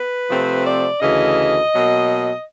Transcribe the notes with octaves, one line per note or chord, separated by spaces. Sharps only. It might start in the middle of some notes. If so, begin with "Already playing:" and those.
Already playing: B4
C3 F3 A3 C4
D5
D2 C#3 E3 D#5
B2 F#3 A#3